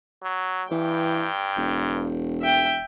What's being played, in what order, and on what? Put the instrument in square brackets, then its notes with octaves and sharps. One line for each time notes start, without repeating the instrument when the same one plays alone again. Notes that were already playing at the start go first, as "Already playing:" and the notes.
[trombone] F#3
[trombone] G2 [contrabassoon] E3 [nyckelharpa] G5
[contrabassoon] E1
[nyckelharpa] E5 G5